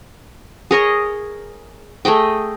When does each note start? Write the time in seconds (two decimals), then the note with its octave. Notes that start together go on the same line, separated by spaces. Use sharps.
0.71 G#4 A#4 C#5 D#5
2.05 A3 G#4 D#5 G5